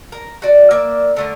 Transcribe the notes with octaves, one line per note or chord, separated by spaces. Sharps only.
A#4
F#4 D5
A#3 D5 E5
D3 A3 A#4